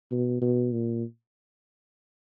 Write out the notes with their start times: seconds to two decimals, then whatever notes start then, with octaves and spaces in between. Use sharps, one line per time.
0.12 B2
0.42 B2
0.72 A#2